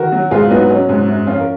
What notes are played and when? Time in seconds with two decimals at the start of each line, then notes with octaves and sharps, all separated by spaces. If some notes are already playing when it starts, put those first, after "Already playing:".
Already playing: D#3 F#4 A#4
0.12 F#3
0.31 G#2 F4 G#4
0.50 F#3 B3 D#4
0.69 F#3 C#4
0.89 G#2
1.07 F#2
1.27 F3 C#4 F4
1.40 A#4